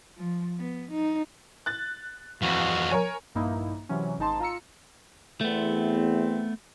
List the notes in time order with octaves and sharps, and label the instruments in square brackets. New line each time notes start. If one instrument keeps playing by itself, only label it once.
[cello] F3
B3
D#4
[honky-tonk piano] F#6 A6
[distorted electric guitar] F2 E3 [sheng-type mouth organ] F#4 F5
[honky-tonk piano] A#4 C#5 G#5
[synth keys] A#1 G2 A#3 D#4 E4
C3 E3 F#3 C#4
G#1 G#2 D#4 A5 C6
F4 A#5 E6 C#7
[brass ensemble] E2 C4 [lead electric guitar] A3 B3